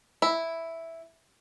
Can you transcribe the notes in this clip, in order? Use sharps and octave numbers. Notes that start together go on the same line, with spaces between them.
E4